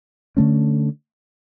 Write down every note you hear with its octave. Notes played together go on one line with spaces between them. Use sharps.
D3 A3 C#4